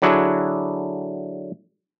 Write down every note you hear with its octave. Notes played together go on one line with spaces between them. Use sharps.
D3 F#3 D4 E4 F#4 G#4